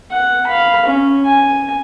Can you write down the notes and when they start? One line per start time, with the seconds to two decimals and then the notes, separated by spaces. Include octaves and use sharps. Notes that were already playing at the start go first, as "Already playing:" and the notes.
0.11 F#5
0.47 F5 B5
0.86 C#4
1.26 G#5